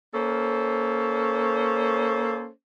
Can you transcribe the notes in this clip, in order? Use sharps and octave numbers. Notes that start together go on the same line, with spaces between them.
A#3 C#4 A4 C5